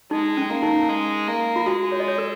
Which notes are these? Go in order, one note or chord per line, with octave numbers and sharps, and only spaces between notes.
G#3 D#4
C#4
A#3
D#4
G#3
A#3
F4
G#3 F#4
C#5
D#5
C#5
A#4